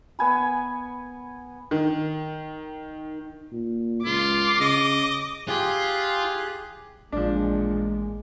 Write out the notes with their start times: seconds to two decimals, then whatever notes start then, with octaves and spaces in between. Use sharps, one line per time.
0.19 B3 G#5 B5
1.71 D#3
3.52 A#2
4.05 C#2 F4 D6
4.61 C#3 D#5
5.48 F4 G4 G#4 F#6
7.12 A1 A#2 F3 G#3 D4